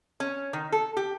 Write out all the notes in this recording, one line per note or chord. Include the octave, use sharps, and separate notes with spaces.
C#4
D#3
A4
G4